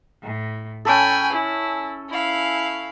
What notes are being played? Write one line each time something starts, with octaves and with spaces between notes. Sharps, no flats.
A2
C#4 A4 G5 G#5 B5
E4
E4 F5